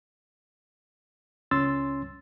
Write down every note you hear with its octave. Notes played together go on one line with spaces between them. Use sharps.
C#2 C#4 C6 E6 A6